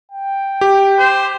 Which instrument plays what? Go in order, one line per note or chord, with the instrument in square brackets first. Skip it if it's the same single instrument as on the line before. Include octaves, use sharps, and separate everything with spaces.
[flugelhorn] G5
[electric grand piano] G4
[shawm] C5